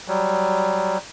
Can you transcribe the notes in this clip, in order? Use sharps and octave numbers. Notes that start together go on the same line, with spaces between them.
F#3 G3